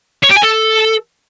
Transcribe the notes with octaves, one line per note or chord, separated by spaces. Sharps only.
C#5
G4
G#5
A4